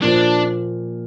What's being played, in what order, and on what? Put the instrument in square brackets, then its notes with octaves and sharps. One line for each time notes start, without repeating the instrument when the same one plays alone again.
[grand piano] A#2 F3 A#3 F4 C5 [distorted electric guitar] D4